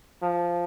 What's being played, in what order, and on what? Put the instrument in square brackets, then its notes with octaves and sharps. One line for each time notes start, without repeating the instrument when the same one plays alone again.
[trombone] F3